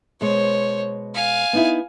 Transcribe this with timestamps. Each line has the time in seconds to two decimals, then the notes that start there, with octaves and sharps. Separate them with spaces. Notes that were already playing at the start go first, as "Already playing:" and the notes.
0.21 B2 G#3 C5 C#5
1.14 F5 G#5
1.53 B3 D#4 E4